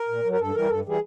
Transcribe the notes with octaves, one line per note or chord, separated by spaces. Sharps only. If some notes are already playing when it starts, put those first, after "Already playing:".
Already playing: A#4
A#2
F#3
A#4
G2 A4
E3 G3 A#4
G2 A4
E3 G3 G#4